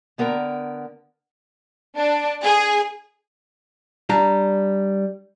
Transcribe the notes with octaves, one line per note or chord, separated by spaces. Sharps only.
D3 B3 A#4 F5 G5 A#5
D4
G#4
G3 D4 A#5